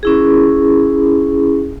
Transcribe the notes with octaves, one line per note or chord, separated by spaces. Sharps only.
C#4 E4 G#4